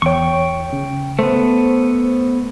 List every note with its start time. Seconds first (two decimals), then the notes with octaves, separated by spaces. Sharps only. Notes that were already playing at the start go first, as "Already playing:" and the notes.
0.02 E2 C#5 G5 C#6
0.73 C#3
1.19 A3 B3 C5